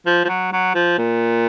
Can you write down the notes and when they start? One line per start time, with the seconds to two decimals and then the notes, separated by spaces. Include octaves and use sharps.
0.06 F3
0.24 F3
0.29 F#3
0.52 F#3
0.75 F3
0.98 A#2